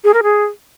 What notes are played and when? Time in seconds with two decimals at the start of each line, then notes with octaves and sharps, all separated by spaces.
0.04 G#4
0.14 A#4
0.23 G#4